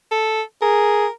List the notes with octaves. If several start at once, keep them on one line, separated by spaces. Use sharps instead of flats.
A4
G#4 A#4